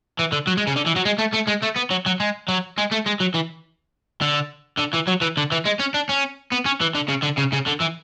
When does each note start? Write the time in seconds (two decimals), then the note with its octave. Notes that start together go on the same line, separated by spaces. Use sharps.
0.19 E3
0.32 D3
0.47 F#3
0.57 G#3
0.67 C#3
0.76 D3
0.86 E3
0.96 F#3
1.05 G#3
1.19 A3
1.34 A3
1.48 G#3
1.63 A3
1.76 B3
1.91 F#3
2.06 F#3
2.20 G#3
2.48 F#3
2.78 G#3
2.92 A3
3.06 G#3
3.21 F#3
3.35 E3
4.21 D3
4.78 D3
4.94 E3
5.08 F#3
5.22 E3
5.37 D3
5.52 E3
5.65 G#3
5.79 C#4
5.94 D4
6.09 C#4
6.52 B3
6.66 C#4
6.81 E3
6.95 D3
7.09 C#3
7.23 D3
7.38 C#3
7.53 C#3
7.67 D3
7.81 E3